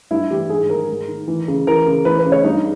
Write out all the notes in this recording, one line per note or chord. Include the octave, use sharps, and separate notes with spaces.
G2 E4
E3 G4
G#2 G#4
D#3 A#4
G#2
D#3
E3
C#3
E3 A#4
C#3
E3 B4
B4
C#3
C#5
G2 D#4